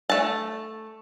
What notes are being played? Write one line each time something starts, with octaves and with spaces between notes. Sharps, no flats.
A3 A5